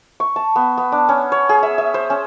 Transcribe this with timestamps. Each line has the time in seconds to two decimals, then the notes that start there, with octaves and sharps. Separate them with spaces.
0.20 C#6
0.36 A5
0.56 B3
0.78 B3
0.92 D4
1.09 C#4
1.32 C#5
1.49 G#4
1.63 E5
1.78 E5
1.94 C5
2.10 C#4